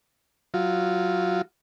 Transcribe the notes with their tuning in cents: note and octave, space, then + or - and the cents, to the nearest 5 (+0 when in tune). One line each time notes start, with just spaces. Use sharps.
F#3 +0 F4 -5